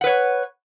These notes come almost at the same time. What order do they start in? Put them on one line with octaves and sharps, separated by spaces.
F#5 B4 C#5